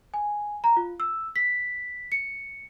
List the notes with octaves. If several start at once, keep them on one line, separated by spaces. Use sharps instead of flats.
G#5
A#5
F4
E6
B6
C#7